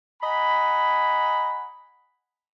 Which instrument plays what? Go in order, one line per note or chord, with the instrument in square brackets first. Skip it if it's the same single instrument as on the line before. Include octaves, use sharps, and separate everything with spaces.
[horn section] D#5 F#5 G#5 A#5 B5